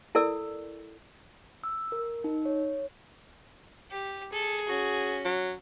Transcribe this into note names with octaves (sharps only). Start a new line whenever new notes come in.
E4 A4 A#4 D5 E6
E6
A#4
D#4
C#5
G4
G#4 A4
C#4 F#4
F#3